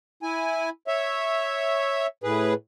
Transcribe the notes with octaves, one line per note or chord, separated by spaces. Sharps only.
E4 G#5
C#5 E5
A2 G#4 B4